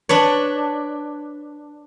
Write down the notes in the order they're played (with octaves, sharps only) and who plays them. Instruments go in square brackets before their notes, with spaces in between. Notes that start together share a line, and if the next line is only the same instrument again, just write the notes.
[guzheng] D4 B4 C#5